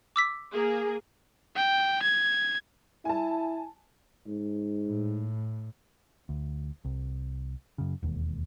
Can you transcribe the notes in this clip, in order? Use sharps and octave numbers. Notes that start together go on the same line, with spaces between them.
D6 E6 B6
A#3 G#4
G5
G#6
E4 G#5 A5
G#2
A2
D2
C2
F#2 C#3
E1 D#2